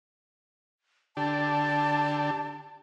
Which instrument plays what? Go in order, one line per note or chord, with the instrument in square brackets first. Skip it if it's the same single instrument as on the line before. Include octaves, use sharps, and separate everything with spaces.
[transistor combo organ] D3 D4 G4 [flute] A5